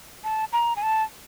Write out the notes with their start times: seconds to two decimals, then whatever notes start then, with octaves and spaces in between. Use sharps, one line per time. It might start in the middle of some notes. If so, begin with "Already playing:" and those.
0.24 A5
0.53 A#5
0.76 G#5
0.83 A5